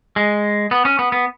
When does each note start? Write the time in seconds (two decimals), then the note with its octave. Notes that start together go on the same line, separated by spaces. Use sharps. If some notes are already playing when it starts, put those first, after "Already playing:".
0.16 G#3
0.71 B3
0.85 C#4
0.99 B3
1.12 B3